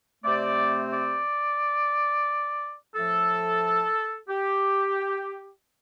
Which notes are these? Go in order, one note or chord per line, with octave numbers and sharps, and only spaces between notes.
C3 A3 C4 D5
D5
A2 F3 A3 A4
G4